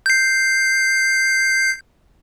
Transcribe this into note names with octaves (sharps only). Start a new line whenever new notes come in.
G6 C7